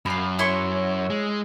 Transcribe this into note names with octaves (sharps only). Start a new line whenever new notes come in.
F#2 F5 B5
E4 C#5 C6 C#6
G#3